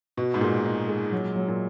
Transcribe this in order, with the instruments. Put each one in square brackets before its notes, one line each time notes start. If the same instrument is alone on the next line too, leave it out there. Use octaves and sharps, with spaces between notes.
[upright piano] B2 [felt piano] F#4
[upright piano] G#2
[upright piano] A#2 [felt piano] G#3
[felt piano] D#4
G#3
F#3
F#3
[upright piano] A#2